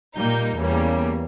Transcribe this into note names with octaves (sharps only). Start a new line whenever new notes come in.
A#2 G3 A#3 D#4 G6
E2 C#3 E3 G3 A#3